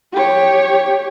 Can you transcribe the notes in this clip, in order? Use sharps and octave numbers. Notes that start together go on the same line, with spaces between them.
G4 C#5